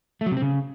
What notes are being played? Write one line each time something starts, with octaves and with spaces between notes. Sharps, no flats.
A3
F#3
C3
C4
C#3